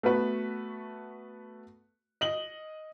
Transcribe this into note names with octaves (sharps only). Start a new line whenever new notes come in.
A3 B3 F#4 B4
D#5 F#7 G7